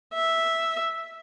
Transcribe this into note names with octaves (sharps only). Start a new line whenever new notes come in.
E5